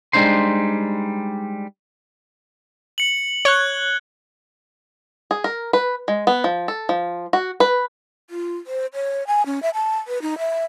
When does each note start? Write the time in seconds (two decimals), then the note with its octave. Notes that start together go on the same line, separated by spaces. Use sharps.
0.13 G3 G#3 D4 D#4 C5 C6
2.98 C#7 F#7
3.45 C#5 C#6 F#6 G#6 G7
5.31 G#4
5.44 A#4
5.73 B4
6.08 G#3
6.27 B3
6.44 F3
6.68 A4
6.89 F3
7.33 F#4
7.60 B4
8.30 F4
8.67 C5
8.94 C#5
9.27 G#5
9.46 C#4
9.62 E5
9.74 A5
10.07 B4
10.22 D#4
10.38 E5